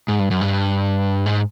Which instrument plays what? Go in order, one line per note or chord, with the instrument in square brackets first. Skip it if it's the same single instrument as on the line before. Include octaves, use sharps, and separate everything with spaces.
[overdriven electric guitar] G#2
G2
F#2
G2
G#2